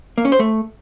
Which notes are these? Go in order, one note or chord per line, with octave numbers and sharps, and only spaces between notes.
A#3
C#4
C5
A3